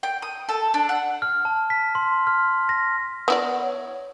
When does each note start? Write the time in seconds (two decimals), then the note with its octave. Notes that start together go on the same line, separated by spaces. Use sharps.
0.03 G5
0.22 D#6
0.49 A4
0.74 D4
0.89 F#5
1.22 F6
1.45 A5
1.70 B6
1.95 C6
2.27 F6
2.69 A#6
3.28 B3 E4 D5 F#5
3.62 C#5